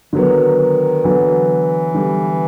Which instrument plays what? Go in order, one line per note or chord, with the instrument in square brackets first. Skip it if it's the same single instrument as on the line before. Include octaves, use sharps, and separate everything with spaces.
[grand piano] D3 F#3 B3 [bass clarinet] D#3
[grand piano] D3 F#3 B3 [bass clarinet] E3
[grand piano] D3 G3 B3